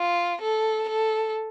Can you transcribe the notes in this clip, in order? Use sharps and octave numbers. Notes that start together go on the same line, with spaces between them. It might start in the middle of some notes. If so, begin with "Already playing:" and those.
Already playing: F4
A4
A4